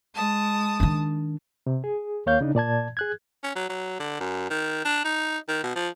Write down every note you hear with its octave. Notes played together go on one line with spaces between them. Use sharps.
G#3 A5 D#6
D#3 D4
C3
G#4
D#2 A#3 C#5 F5 G6
C#3 D4 D#4
A#2 D5 A5 G#6
G#4 F#6 G#6
C#4
F#3
F#3
D3
F#2
D#3
D4
D#4
D#3
B2
F3